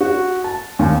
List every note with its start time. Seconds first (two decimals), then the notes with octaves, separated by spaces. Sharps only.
0.01 F#4
0.44 A5
0.79 D#2